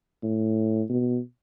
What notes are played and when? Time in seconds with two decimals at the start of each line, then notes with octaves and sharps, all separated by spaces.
0.23 A2
0.89 B2